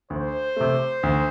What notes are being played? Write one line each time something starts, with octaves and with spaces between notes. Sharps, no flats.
D2 C5
C3 A3
D2